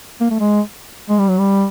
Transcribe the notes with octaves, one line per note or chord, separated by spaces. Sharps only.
A#3
A3
G#3
G#3
G3
F#3
G3